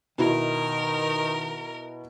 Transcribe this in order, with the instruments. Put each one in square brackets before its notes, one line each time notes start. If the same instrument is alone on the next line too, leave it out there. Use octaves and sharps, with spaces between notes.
[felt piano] B2 E4 [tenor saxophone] D#3 [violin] A#4